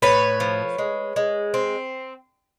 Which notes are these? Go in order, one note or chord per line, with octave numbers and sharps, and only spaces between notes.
A2 B4 C#5
F3
G#3
G#3
C4